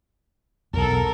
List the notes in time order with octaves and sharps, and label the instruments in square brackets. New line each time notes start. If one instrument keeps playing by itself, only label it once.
[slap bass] B1 E2 [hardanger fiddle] A4 A#4